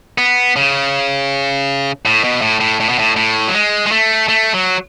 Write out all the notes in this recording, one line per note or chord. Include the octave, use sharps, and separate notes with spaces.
B3
C#3
A2
B2
A2
A2
A2
B2
A2
A2
F#3
G#3
G#3
A3
A3
F#3